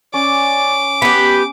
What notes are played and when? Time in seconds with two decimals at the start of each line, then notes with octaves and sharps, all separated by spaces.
0.14 C#4 D5 D6
1.02 B3 G4 B5